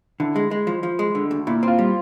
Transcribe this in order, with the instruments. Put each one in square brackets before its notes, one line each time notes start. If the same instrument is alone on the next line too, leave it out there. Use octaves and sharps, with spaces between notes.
[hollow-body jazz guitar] D3 [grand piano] E4
[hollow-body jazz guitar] G#3
G#3
F3
F3
G#3
D3
D2
[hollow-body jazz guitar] A#2 [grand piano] E4
[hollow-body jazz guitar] C4 [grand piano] F4
[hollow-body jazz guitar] G3